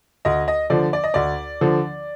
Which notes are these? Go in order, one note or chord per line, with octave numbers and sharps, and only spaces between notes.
D2 D#5
D#5
D3 F3 D5
D5
D#5
D2 D5
D3 F3